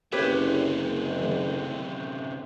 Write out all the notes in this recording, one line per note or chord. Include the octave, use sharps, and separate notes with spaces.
F#1 F#2 C3 G4 B4 C#5
D#3 A3